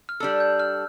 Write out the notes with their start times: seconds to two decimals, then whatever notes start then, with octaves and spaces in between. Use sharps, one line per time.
0.09 F6
0.20 G3 D4 A4 E6
0.40 G6
0.60 F6